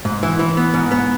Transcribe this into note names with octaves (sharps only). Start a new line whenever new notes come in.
G#2
E3
E3
B3
G#2
B3